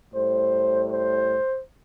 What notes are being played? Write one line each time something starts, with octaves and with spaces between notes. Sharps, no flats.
A2 G3 C5
C5